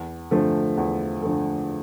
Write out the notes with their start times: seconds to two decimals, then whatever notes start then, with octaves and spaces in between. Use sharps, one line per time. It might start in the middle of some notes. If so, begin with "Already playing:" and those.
Already playing: E2
0.31 D3 F3 A3
0.77 E2
1.22 D3 F3 A3